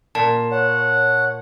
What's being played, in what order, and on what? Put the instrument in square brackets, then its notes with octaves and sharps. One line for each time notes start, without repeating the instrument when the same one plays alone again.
[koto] A#2 [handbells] A5
[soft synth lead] C#5 [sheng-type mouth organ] F#5